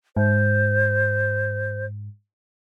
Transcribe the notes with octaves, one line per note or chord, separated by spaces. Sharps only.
G#2 C5